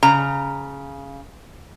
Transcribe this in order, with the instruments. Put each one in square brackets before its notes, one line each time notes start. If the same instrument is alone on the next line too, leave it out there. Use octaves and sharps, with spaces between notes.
[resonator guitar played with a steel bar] C#3 A#5